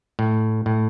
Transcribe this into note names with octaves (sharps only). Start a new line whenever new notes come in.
A2
A2